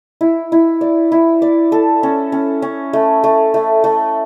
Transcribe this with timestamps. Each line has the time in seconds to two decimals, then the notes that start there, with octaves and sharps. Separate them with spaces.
0.21 E4
0.52 E4
0.81 D5
1.12 E4
1.42 D5
1.72 A4
2.03 C#4
2.32 C#4
2.62 C#4
2.93 A3
3.24 A3
3.54 A3
3.84 A3